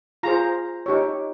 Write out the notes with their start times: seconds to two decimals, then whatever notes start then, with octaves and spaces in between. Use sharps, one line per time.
0.23 F4 G#4 C5 A#5
0.86 D#4 G4 C#5